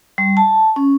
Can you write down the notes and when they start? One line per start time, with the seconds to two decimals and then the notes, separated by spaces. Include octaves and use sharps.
0.18 G3
0.37 A5
0.76 C#4